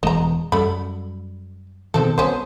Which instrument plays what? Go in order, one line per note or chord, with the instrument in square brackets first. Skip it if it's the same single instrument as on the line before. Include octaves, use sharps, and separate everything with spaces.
[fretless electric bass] E1 E2 G#3 [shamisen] D#5 A#5
[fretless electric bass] F#2 G3 [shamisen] A4 B5
[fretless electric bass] B2 D#3 [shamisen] G#3 C4 A4
[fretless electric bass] C2 [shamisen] B3 C#4 C5